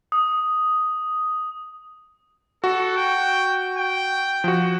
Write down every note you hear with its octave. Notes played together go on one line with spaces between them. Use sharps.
D#6
F#4 A4
G5
G5
F3 F#4